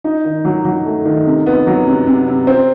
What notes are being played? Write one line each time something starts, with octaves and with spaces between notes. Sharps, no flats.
D#4
D#3
F#3
F#3
A3
D#3
C3
B3
F#3
C3
C3
C3
C4